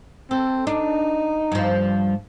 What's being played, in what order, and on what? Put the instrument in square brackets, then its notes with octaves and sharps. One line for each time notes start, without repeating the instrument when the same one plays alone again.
[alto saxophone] C4 [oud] A4
[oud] D4 [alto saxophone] D#4
[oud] G2 F3